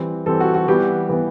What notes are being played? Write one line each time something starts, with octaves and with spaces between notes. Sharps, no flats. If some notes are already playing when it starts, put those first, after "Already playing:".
Already playing: E3 G3 C4
E3 G3 C4 A4
F#4
F#4
E3 G3 B3 G4
E3 G3 B3